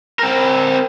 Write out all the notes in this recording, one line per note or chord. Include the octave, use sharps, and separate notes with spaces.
C4 A#4